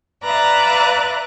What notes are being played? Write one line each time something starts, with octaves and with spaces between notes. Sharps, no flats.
B4 D5 E5 F5 A#5 F#6